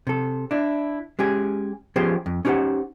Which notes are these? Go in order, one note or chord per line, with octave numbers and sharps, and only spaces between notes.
C3 A4
D4 E4
G#3 C#4 G4 G#4
F3 B3 C#4 G4 G#4 C5
F2
C#4 D#4 G4 A#4 C5 F#5